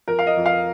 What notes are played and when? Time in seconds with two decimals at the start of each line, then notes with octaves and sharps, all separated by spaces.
0.08 F2 A#4
0.19 F5
0.27 D#5
0.37 F2
0.46 F5